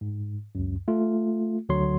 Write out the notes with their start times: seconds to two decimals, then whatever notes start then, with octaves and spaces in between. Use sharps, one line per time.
0.01 G#2
0.55 C#2 F#2
0.88 A3 F4
1.69 D2 D3 F#3 C#5 C6